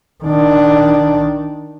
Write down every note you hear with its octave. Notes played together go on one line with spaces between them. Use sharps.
D#3 D4